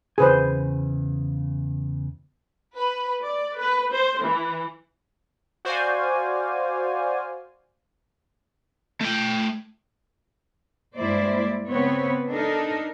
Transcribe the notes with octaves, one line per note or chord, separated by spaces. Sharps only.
E2 C#3 G#4 B4 C5 G#5
B4
D5
B4
C5
E3
F#4 C5 D5 F5 G#5
A3 G5
G2 G#3 A#3 E4 C5 D5
C#3 B3 C4 B4 C#5
D4 D#4 A4 A#4